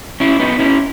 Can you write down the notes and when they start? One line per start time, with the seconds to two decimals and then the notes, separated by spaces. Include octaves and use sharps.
0.20 C#4 E4
0.40 B3 D#4
0.59 C#4 E4